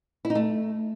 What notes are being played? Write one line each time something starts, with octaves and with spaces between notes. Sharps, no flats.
E4
D#4
A3